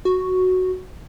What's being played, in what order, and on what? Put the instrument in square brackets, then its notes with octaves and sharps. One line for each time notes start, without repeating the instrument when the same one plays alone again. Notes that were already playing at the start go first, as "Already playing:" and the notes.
[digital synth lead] F#4